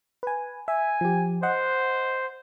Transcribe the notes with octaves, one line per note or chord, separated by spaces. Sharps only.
B4 G#5
E5 G#5
F3 G4
C5 D#5 F#5